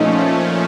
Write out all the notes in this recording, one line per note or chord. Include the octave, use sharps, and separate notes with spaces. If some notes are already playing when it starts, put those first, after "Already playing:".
Already playing: A#2 F3 A3 C#4 D#4